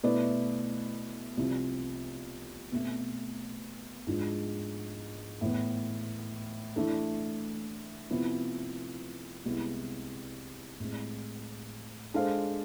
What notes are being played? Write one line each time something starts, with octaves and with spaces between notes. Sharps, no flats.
B2 A3 E4 B4 D5
C2 C3 F3
B2 A3 C4
G#2 F3 G#3 D4 F4
A2 E3 B3
E3 A3 D4 A4
C3 F3 B3 E4
C2 C3 G#3 B3 E4
A2 G#3 C4
G#3 D4 A4 C5 F5